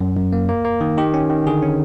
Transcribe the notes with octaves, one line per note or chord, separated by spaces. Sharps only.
F#2
F#2
A#3
A#3
A#3
D#3
D#3 G4
C#4
D#3
D3 G#4
C#4